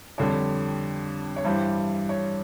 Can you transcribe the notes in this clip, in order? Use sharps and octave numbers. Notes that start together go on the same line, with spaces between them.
F2 D3 G3 C#5
C#5
G2 E3 G3 C5
C#5